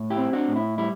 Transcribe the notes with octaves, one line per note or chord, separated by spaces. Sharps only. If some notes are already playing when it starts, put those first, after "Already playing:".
Already playing: A2
E4 G4
C4
D4 F#4
A2
E4
G3 E4